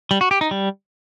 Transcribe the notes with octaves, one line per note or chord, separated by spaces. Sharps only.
G3
F#4
G4
D#4
G3